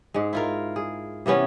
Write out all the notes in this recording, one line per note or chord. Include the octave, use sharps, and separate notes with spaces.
G#2 G#3
E4 F4 A#4
G#4
C3 E3 B3 C#4